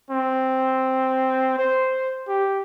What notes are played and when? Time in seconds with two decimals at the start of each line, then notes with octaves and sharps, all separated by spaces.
0.10 C4
1.59 C5
2.28 G4